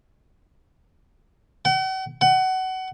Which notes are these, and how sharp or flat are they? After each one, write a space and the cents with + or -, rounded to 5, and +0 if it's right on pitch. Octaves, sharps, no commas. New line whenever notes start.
F#5 +45
F#5 +25